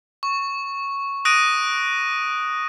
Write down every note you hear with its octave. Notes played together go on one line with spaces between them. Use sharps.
C#6
D#6 F#6 A#6 D7 D#7